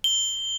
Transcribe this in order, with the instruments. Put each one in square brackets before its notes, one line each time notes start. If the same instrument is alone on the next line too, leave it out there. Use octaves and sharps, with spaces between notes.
[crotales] G7